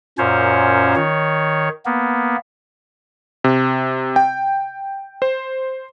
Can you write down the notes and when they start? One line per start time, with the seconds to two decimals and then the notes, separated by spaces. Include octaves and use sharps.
0.18 F#2 A#2 C#4 C5 C#5
0.96 D#3 C#5
1.85 A#3 B3
3.44 C3
4.16 G5
5.22 C5